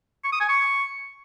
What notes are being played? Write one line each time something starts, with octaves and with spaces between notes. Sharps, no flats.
C#6
D#6
G#5
C#6